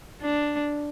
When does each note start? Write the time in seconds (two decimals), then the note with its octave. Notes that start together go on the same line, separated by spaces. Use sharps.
0.22 D4